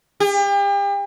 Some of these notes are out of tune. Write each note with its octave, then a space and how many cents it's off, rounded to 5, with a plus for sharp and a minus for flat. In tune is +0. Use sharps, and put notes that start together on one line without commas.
G4 +40